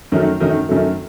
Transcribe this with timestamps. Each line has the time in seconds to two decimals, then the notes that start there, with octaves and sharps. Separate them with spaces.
0.12 F#2 D#3 F#3 A3
0.40 F#2 D#3 F#3 A3
0.69 F#2 D#3 F#3 A3